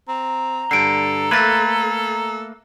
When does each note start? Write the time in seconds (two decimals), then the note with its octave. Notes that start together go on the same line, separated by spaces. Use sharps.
0.08 C4 A#5
0.71 G2 D3 A4 C7 D7
1.31 A3 A#3 B4 G#6 A6 B6